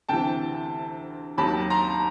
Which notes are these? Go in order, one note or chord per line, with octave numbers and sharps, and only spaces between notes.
D2 C3 E3 G5 A5
D#2 D#3 F#3 A5 B5
A#5 C6